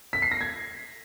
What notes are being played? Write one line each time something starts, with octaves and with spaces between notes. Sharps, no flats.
B6
C7
A#6
G#6